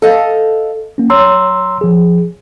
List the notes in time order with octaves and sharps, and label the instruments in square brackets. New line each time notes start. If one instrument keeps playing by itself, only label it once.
[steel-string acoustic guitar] A4 D#5 F5
[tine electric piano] A#3 C#4
[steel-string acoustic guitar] F#3 [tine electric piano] A#5 C6 E6
[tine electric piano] F3 G#4